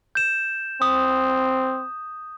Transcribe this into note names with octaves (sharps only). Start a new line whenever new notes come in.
G6 E7
C4 D#6